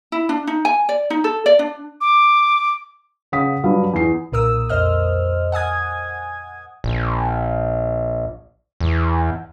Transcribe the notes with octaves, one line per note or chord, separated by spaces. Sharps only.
E4
D4
D#4
G#5
D5
D#4
A4
D5
D4
D6
C#3 F5 F#5 D#6 B6
G2 F#3 F5
E2 C7
B1 A#2 A#4 D#6 E6
F2 C5 D#5 F6
F#5 G#5 D#6 G#6
A#1
E2